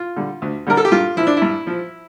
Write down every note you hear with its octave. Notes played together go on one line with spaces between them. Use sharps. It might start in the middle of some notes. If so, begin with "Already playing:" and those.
Already playing: F4
D3 G3
D2
D3 G3 A#4
A4
G4
G2 F4
F3 E4
D4
E4
G2
F3